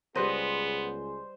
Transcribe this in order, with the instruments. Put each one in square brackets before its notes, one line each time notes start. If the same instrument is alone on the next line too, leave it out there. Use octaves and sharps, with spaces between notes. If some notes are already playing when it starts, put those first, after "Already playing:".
[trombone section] C#2 G#4 [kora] G3 B4 D#5 [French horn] B3 [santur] C5